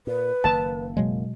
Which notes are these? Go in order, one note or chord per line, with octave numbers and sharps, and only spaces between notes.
A#2 B4
F#1 D#3 A#3 A5
B2 F#3 G#3